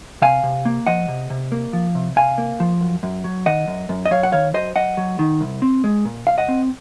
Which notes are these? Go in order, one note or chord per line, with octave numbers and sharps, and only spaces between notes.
C3 F5 G#5
C3
A#3
F3 D#5 F#5
C3
C3
A#3
F3
C3
C3 F5 G#5
A#3
F3
F#2
F#2
F#3
D#3 D#5 F#5
F#2
F#2
D#5
F#3 C#5 F5
F#5
D#3 C#5 F5
F#2 C5 D#5
F#2 D#5 F#5
F#3
D#3
C2
C4
G#3
A#2
C2 F5
D#5 F#5
C4